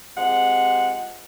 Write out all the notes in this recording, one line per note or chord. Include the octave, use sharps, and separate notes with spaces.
C3 F3 G#3 F#5